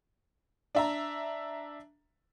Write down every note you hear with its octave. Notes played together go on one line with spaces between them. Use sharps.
D4 E5 A#5